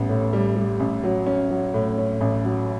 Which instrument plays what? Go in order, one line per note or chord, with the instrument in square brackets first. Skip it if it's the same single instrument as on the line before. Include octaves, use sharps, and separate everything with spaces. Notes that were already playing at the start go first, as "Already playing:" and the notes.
Already playing: [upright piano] A1 G3 B3
A2
G3
G3
A1
F#3
C#4
F#3
A2
C#4
A1
F#3